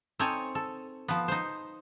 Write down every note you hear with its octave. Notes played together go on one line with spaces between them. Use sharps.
C4 D#4 A4 C#5 G#5
A4
F3 B3
D#4 C5